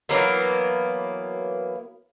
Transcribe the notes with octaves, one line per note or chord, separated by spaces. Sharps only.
E3 F#3 A#3 B3